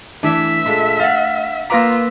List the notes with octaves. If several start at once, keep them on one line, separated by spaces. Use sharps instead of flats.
E3 A3 D4 E5
A#2 G#3 A4
F5 F#5 A6
A#3 F4 B4 A#5 D6 E6 A#6 B6